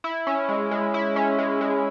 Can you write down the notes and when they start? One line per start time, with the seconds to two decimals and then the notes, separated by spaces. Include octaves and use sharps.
0.04 E4
0.27 C#4
0.49 G#3
0.71 G#3
0.94 E4
1.16 C#4
1.38 G#3
1.61 G#3